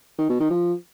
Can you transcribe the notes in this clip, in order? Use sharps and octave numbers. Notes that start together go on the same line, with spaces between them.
D#3
B2
D#3
F3